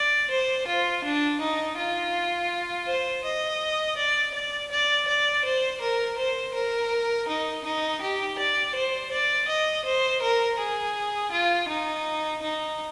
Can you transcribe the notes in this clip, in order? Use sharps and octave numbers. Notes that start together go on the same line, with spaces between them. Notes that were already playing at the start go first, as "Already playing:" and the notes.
Already playing: D5
C5
F4
D4
D#4
F4
C5
D#5
D5
D5
D5
D5
C5
A#4
C5
A#4
D#4
D#4
G4
D5
C5
D5
D#5
C5
A#4
G#4
F4
D#4
D#4